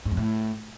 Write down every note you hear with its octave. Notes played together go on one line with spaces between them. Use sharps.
G#2
F2
A2